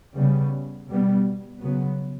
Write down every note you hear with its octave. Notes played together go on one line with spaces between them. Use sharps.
C#3 G3 B3
B2 G3 B3
C#3 F#3 B3